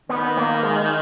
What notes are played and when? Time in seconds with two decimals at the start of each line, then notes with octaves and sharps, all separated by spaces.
0.09 D#3 B3
0.37 A#3
0.63 G#3